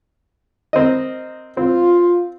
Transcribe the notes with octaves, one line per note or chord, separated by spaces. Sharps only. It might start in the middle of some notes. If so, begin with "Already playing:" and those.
C4 A#4 D#5
C4 F4